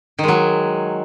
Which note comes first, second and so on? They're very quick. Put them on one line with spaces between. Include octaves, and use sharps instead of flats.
D#3 G#3 F#3